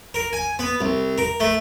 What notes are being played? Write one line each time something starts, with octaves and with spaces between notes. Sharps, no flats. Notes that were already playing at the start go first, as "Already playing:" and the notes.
A#4
G#5
B3
C2
A#4
A3